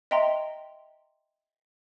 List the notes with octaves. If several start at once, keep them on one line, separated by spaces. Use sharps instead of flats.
D#5 E5 G5 A#5 C6